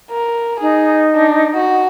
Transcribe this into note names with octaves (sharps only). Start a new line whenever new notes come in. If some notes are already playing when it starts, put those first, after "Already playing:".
A#4
D#4 G#4
D4
F#4